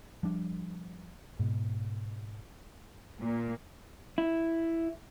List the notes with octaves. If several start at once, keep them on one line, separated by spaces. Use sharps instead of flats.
F3 G3 D4
G#2 B2
A#2
E4